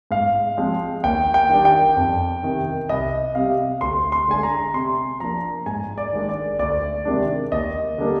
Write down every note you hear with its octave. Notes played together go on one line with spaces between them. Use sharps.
G#2 F5
F3 G#3 C4
D#2 G5
G5
D#3 G3 D4
G5
F2
C3 D#3
C2 D#5
C3 G3 F5
D2 C6
C6
D3 G#3 D4 G#5
A#5
C3 C6
F3 A#3 D4 A#5
G#2 G#5
D5
D#3 G#3 D4
D5
D2 D5
C3 D#3 G#3 D4
D#2 D#5
D3 G3 A#3 D4